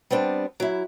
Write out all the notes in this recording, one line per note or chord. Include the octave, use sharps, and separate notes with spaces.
G3 B3 C4 D4
F#3 E4